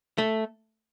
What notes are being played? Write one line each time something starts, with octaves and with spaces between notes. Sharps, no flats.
A3